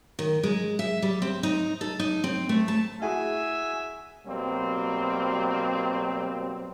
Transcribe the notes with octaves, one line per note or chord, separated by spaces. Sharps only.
D#3
G#3
E5
G3
C4
D#4
A4
D#4
C4
A3
A5
E4 F#4 G#4 E5 G#5
B2 F#3 G3 A#3 C4